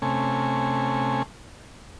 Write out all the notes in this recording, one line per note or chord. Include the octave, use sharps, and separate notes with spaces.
C3 A3 C#4 G#5